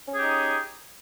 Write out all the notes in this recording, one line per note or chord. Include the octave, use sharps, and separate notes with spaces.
C#4 D#4 G4 G#4